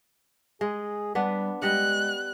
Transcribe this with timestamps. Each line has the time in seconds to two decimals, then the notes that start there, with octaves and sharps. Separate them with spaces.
0.61 G#3 G#4
1.15 G3 B3 D4 B4
1.62 G3 G#3 D#5 F#5 F#6